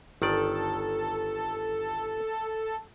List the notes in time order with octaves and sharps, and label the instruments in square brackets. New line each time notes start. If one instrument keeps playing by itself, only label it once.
[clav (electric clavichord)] G1 D#3 D5 [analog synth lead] A4